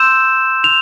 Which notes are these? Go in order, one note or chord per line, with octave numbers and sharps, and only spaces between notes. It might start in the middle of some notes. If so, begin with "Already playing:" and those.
Already playing: C6 E6 G6 E7
F7